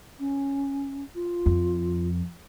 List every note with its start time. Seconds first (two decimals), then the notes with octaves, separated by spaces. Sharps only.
0.20 C#4
1.15 F4
1.46 F2